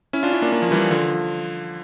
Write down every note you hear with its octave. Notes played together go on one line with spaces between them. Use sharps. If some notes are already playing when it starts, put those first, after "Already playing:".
C#4 E4
D4 F4
C#4 E4
A#3 D4
A#3 D4
F3
E3 G3
D3 F3